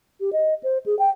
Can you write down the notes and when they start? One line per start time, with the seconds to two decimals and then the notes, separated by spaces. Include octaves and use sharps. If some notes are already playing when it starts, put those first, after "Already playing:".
0.20 G4
0.33 D#5
0.63 C5
0.86 G#4
0.99 G5